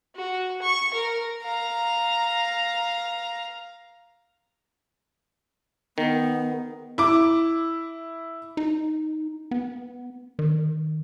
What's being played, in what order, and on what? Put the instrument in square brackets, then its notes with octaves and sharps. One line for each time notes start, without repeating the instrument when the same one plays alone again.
[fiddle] F#4
C#6
A#4
F5 A#5
[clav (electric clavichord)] D#3 [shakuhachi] B3
[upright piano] E4 D6
[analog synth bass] D#4
B3
D#3